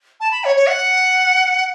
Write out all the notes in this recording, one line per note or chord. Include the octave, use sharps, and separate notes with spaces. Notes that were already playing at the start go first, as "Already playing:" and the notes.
A5
B5
C#5
C#5
F#5